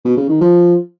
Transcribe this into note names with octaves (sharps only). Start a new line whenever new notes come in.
B2
C#3
D#3
F3